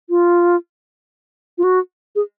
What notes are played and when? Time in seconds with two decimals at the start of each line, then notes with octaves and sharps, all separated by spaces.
0.10 F4
1.58 F4
1.64 F#4
2.16 G#4